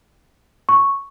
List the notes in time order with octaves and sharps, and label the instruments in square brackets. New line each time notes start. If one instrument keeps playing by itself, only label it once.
[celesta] C#6